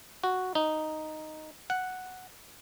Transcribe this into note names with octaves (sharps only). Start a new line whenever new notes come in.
F#4
D#4
F#5